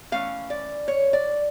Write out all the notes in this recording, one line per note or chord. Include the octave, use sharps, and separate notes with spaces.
E3 A3 C#4 F5
D5
C#5
D5